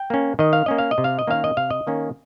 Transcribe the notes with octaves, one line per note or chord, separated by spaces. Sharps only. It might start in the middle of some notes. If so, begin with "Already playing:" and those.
Already playing: G5
A#3 C#4
D#3 D#5
F5
A#3 C#4 D#5
F5
D#5
C3
F5
D#5
D#3 A#3 C#4 F5
D#5
C3 F5
D#5
D#3 A#3 C#4